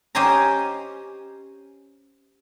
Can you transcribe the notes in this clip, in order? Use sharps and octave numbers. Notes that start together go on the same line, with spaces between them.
C#4 G4 C5 D#5 G#5 A#5